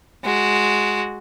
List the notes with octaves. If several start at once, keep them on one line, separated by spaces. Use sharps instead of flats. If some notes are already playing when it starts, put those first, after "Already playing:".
G#3 F#4